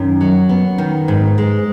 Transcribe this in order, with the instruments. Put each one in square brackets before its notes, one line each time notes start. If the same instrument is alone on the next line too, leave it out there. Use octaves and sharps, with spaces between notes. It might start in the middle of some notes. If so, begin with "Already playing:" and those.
Already playing: [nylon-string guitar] F#2 D#3
F#3
B3
D#3
G#2
G#3